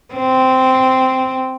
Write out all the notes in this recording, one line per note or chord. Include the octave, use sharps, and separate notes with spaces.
C4